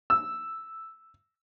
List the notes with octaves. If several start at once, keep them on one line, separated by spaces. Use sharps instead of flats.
E6